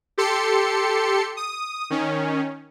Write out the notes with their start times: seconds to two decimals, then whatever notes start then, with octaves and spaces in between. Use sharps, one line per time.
0.18 G4 A4 C6 C#7
1.37 D#6
1.90 D#3 C#4